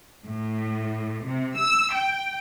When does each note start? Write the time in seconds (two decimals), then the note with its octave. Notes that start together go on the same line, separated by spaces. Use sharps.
0.25 A2
1.24 C3
1.58 E6
1.94 G5